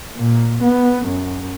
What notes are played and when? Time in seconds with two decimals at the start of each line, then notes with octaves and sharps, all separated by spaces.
0.17 A#2
0.63 B3
1.06 F#2